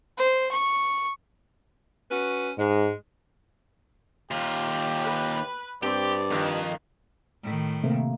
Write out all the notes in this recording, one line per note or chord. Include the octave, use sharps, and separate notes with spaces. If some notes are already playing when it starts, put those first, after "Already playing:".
C5
C#6
C#4 F#4 B4
G#2 G#3
D#2 F4 G4
B4
G2 C4 G4 D5
F2 D#3
A2 D#3
C3 A3 A#3